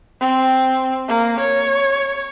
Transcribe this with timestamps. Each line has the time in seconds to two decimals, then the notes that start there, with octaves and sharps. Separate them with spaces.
0.20 C4
1.08 A#3
1.39 C#5